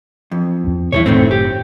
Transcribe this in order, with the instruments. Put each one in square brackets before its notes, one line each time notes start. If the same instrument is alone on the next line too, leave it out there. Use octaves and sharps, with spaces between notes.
[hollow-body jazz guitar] F2
[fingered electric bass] E2 C4
[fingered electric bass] B2 E3 G3 [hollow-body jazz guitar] E4 G#4 C#5
[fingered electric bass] F#1 A2 [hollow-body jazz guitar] D#3 A3 C4
[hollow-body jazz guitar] G4